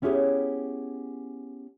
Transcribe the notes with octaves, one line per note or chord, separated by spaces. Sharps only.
B3 C#4 E4 G4 G#4 C#5